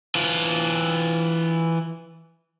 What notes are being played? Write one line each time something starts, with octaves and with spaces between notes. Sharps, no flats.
E3 F4